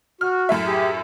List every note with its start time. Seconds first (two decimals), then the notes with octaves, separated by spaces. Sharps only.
0.21 F#4 F6
0.49 F#2 A2 E5
0.66 G4 G#4